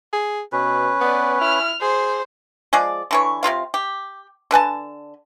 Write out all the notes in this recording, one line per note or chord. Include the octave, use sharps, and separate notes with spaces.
G#4
B2 C#4 B4
B3 D5
E4 F6
G#4 C5
F3 G#3 G#4 D5
D3 E3 C#5
C3 A#3 F4 F5
G4
D3 B4 G#5 A5